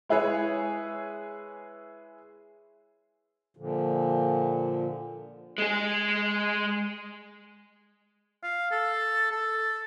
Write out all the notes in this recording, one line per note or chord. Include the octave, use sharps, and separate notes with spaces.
G#3 E4 G#4 B4 C#5
A#2 D3 F3
G#3 G#4
F5
A4
A4